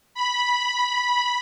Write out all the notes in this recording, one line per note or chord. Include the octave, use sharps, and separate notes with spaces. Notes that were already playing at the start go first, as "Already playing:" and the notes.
B5